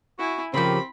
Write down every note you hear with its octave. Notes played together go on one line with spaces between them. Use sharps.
E4 F#4 G#5
C#3 F3 C4 G4 A#4 B5